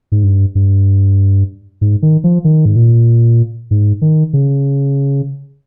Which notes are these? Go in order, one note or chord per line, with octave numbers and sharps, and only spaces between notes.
G#2
G2
G2
G#2
D#3
F3
D#3
G#2
A#2
G#2
D#3
C#3